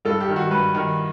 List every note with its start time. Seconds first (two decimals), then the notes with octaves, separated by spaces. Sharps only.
0.05 G2 A4
0.21 G4
0.28 D#3
0.36 F#4
0.51 G2 B4
0.75 D#3